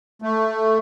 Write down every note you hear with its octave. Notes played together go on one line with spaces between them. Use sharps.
A3